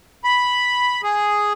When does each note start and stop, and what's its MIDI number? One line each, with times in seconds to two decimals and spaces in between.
0.24 1.01 83
1.03 1.53 68